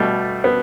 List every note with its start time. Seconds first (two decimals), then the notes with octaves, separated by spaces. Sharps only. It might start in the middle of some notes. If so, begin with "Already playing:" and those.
Already playing: B2 G3 A3
0.44 B3